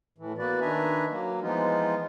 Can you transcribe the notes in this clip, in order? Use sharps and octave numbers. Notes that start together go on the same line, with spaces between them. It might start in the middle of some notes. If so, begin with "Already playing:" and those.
A2 E3
A#3 B3 F#4 B4 D5
D#3 D4 B4 E5 G#5 A#5
F#3 A#3
E3 F3 G#3 B3 D#4 F4